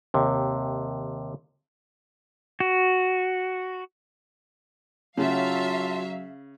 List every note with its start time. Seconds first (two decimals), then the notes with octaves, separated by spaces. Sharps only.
0.14 D#2 C3
2.60 F#4
5.18 C#3 F#3 F4 E5 F5 A5 C6